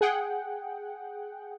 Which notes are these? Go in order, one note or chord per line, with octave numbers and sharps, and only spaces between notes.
G#4 F#5 G5